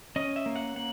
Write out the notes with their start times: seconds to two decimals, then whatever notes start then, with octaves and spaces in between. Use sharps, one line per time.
0.16 C#4 D#5
0.36 E5
0.46 A#3
0.56 F#5
0.76 A#3 F#5